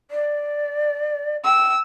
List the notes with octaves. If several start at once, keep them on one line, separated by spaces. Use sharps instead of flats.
D5
G5 E6